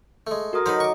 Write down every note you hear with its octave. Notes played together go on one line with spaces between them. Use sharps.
G#3 A3
F#4 A4 A#4 D#6
F#3 D#4 B4 C5
C#6 D6